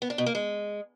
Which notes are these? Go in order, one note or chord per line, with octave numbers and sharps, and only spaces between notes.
B3
D4
B2
A#3
G#3